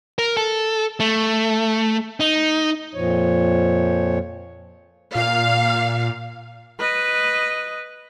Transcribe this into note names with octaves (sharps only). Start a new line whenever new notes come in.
A#4
A4
A3
D#4
F2 A#2 F3 C#5
A#2 F5
B4 D#5